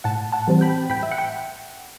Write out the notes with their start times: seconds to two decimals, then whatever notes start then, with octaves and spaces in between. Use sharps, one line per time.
0.04 A2 F#5 A5
0.32 F#5 A5
0.47 E3 G3 C4
0.61 G5 B5
0.90 A2 G5 B5
1.03 E5
1.11 F#5
1.18 G5